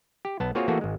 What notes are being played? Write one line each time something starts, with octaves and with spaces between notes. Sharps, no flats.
G4
B1 B3 A5
A#3 C4 F4 F#4 G#4 C#5
E3 A3 A#3 F#4 G#4 A4
G#1 G#3